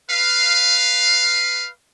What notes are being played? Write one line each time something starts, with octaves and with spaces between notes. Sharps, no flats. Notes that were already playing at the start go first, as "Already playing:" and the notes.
B4 F5